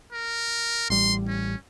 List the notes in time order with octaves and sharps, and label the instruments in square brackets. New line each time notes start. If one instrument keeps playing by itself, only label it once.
[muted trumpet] A#4
[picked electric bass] A1 G3 [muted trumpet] C6
[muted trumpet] C#4